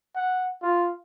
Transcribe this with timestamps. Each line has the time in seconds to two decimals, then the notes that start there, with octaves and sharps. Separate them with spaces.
0.15 F#5
0.62 F4